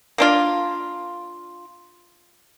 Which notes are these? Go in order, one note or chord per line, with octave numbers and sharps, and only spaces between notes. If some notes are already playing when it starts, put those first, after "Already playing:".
A#3 D4 F4